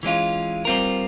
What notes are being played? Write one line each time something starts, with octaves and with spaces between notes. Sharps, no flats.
E3 G#3 C#4 F4
G3 C4 F4 A#4